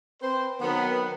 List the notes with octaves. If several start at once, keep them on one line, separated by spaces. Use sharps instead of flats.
C4 B4 C5
D#3 F#3 B3